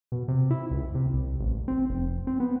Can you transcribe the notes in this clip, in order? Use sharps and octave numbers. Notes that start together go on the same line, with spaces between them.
B2
C3
E4
C#2
C3
C2
A1
C4
F1
C4
B3